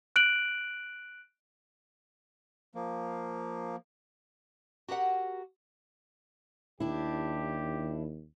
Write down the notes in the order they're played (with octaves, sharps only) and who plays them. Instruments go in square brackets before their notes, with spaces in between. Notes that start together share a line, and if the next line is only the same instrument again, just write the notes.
[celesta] F#6 D7 F#7
[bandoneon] F3 A#3
[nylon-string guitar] F#4 G4 A#4 F#5
[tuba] D#2 [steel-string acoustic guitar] D4 E4 [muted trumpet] G4